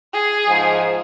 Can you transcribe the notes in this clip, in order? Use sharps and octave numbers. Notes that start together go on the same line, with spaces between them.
G#4
G#2 F3